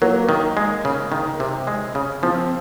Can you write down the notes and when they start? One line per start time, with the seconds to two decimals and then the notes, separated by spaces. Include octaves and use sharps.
0.02 F#3 A#3
0.29 D#3
0.57 G#3
0.85 C#3
1.12 D#3
1.40 C3
1.67 G#3
1.95 C#3
2.23 F3 C4